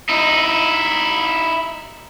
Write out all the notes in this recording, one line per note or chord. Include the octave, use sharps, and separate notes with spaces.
D#4 E4